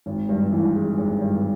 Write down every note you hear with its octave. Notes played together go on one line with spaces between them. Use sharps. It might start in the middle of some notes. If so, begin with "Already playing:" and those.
G#1
G2
E3
G#3
G#1
G2